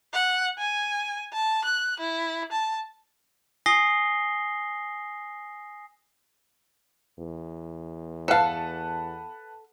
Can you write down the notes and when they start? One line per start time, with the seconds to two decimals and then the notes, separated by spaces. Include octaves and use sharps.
0.14 F#5
0.59 G#5
1.33 A5
1.65 F#6
2.00 E4
2.52 A5
3.66 G#5 D#6 A#6 C7 G7
7.19 E2
8.28 A4 B4 F5 F#5 A5